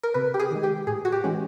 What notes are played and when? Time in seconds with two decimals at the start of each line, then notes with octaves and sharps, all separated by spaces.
0.03 A#4
0.14 C3 B4
0.34 G4
0.40 G#4
0.51 D#3 G#3
0.63 G4
0.87 A2 G#4
1.05 F#4
1.12 G4
1.24 E3 G#3 C#4